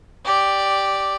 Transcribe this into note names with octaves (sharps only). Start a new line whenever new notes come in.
G4 D5